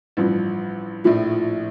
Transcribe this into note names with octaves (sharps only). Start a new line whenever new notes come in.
A1 G2 F3
A#1 A2 F3